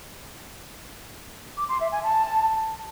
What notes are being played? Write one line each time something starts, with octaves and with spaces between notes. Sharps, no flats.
D6
C6
E5
G#5
A5